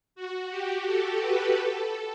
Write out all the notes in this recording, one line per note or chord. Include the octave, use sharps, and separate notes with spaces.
F#4
G4
A4
B4
A4